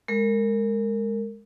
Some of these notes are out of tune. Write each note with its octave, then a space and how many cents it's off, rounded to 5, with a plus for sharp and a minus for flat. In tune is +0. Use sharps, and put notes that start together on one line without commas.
G#3 +0 A#4 -25